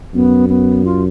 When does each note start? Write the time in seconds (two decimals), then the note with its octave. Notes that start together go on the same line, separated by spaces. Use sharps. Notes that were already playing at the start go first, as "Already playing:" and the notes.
0.14 F#2 B3
0.49 B3
0.85 F4